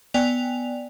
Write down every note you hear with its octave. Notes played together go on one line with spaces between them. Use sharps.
B3 D5 G5 G#5 F7